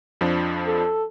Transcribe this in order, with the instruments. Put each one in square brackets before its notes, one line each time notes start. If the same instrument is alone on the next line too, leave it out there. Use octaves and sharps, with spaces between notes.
[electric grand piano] F2 F3 D4
[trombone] A4